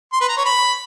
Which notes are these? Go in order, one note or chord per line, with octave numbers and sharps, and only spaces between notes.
C6
B4
A#5
C#5
B5